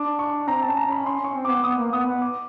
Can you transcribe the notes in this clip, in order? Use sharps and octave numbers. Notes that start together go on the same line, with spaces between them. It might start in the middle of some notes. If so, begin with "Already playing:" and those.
Already playing: D4 D6
C#6
C4 A#5
A5
C#4
A#5
C#4 B5
C#4 C6
C#4 C#6
C4
B3 D6
B3 D#6
A#3
B3 D#6
B3
D6